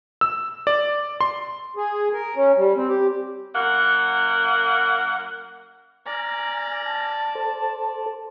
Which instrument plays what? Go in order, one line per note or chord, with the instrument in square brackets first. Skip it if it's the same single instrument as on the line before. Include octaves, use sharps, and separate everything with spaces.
[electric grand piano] E6
D5
C6
[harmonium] G#4
A#4
C#4
G3
C4
G4
[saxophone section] F#2 A#3 F#5
[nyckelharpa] D5 [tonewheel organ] G#5 F6 A#6 [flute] A#5
[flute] A5
[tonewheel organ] A4 C5